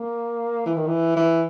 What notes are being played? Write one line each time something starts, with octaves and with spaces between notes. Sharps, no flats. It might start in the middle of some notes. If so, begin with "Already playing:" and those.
Already playing: A#3
E3
D#3
E3
E3